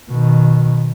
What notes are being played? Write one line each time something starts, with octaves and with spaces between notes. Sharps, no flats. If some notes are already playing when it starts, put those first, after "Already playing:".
B2 D#3